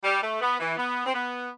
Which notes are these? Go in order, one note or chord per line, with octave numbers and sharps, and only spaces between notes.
G3
A3
B3
E3
B3
C4
B3